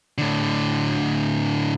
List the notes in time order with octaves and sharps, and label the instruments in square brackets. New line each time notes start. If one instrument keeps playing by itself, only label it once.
[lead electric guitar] A2 D3